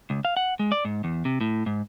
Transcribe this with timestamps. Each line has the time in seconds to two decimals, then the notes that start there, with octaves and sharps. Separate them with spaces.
0.10 C#2
0.25 F5
0.37 F#5
0.59 G#3
0.72 D5
0.85 G#2
1.04 E2
1.25 C3
1.41 A2
1.66 G#2